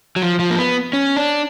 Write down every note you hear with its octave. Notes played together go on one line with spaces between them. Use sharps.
F#3
F3
F3
A#3
B3
C#4
D4